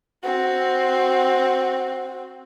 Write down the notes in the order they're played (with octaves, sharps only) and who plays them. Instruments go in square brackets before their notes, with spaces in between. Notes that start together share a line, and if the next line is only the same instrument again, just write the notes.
[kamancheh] C4 F#4